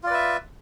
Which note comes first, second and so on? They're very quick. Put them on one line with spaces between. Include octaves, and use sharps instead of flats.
F4 D5 B4 E5